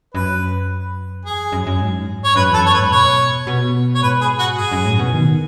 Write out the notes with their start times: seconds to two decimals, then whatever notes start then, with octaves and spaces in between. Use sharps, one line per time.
0.14 F#2 B4
1.25 E2 G#4
1.39 F#2
1.52 F#2
1.67 F#2
1.81 G#2
2.25 C#5
2.36 F#2 B4
2.50 E2 A4
2.64 F#2 C#5
2.73 B4
2.78 G#2
2.92 B2 C#5
3.47 B2
3.95 C#5
4.02 G#2 B4
4.21 G#4
4.39 F#4
4.57 F#2 G#4
4.72 F#2
4.85 A2
4.99 B2
5.14 D#3